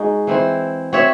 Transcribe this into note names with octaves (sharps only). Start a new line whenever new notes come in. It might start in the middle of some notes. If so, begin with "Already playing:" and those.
Already playing: G#3 D#4 F#4
E3 C4 E4 C5
C4 F#4 C#5 E5